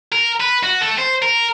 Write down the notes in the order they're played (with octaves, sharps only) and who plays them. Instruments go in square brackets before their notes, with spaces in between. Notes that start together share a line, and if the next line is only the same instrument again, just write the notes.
[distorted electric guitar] A#4
B4
F#4
A3
C5
A#4